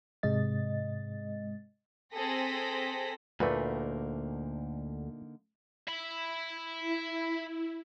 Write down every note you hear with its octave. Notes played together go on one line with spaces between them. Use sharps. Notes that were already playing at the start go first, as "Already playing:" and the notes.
G#2 C3 G#3 D#5 A6
C4 G#4 A4 A#6 B6
D2 A#2 D3 A3 A#3 D#4 B4
E5 B5
E4